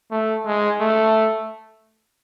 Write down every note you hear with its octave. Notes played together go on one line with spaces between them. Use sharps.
A3
G#3
A3